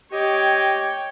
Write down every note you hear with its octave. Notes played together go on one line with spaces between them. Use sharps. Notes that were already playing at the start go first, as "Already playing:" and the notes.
G4 C#5 D#5 G5